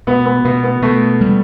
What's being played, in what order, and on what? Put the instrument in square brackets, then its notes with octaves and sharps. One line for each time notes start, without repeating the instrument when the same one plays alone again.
[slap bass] B2 [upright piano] B3
[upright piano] B3
[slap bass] B2 [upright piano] B3
[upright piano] B3
[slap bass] B2 [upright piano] A3
[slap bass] G3